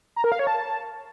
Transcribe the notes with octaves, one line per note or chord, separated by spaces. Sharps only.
A#5
A#4
F5
C#5
A5